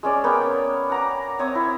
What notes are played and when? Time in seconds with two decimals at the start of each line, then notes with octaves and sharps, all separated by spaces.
0.03 G#3 C#4 D5
0.24 A#3 B3 G5
0.90 F#5 A#5 D6
1.39 C4 C#5 E5 D#6
1.55 E4